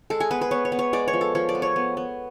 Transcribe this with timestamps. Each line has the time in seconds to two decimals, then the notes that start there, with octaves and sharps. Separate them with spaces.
0.10 G#3 A4
0.20 G#4
0.31 B3 B4
0.41 B4
0.51 B3 C#5
0.65 C#5
0.72 B3
0.79 C#5
0.93 G#3 D5
1.08 C#5
1.13 F3
1.21 A4
1.35 F3 C#5
1.49 D5
1.55 B3
1.62 C#5
1.76 B3
1.97 B3